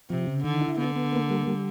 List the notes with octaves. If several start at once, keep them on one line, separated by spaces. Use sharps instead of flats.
C3 F3
C#3
D3 D#3
E4
D3 B3
B3
A#3
G3
G3